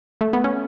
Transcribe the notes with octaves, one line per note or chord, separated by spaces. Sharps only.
A3
B3
C#4